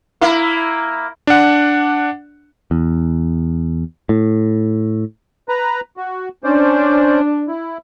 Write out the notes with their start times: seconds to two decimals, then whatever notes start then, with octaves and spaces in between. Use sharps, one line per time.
0.21 A#3 E4
1.27 D4 F#5
2.71 E2
4.09 A2
5.49 B4 A#5
5.97 F#4
6.44 C#4 D4 C5 D5
7.48 E4